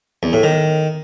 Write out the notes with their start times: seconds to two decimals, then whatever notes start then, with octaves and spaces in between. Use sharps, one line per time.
0.23 E2
0.33 A2
0.43 D#3